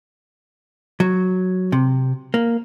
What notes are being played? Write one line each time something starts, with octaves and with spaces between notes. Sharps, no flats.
F#3
C3
A#3